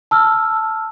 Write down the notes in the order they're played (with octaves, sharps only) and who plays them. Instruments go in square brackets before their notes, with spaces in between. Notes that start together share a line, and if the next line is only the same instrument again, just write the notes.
[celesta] A5 E6 F6